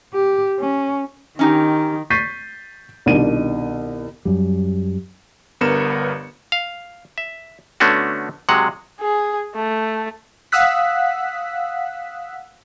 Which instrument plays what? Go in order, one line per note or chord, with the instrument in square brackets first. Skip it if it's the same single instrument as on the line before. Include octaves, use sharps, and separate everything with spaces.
[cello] G4
C#4
[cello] D#3 [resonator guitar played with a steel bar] C#4 D#4 G4
[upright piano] C#6 G6 A6 B6 C7 D#7
C2 B2 D#3 D4 D#7
[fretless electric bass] F#2 G3
[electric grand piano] G1 G2 B3 A#4 C#7 E7
[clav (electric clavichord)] F5
E5
D3 A3 B3 C#4 D4 F#4
C3 F#3 G#3 F#5
[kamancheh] G#4
A3
[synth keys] F5 F#5 D#6 E6 F#6 B6